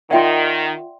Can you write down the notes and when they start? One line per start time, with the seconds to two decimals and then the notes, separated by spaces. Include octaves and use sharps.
0.11 D#3 F4 D5 E5 F#5 G5 C6